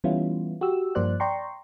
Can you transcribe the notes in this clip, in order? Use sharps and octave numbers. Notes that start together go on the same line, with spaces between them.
E3 G3 B3 C#4 E4 F4
F#4 G4 E6
G2 F3 A#3 C5 D5 F#6
D5 G5 A#5 C6 C#6